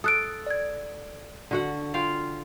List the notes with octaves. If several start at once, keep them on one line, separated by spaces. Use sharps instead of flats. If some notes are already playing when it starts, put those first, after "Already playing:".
A4 D#6 F#6 D7
D5 G#6
D3 F#4 F#5
F4 F5 G5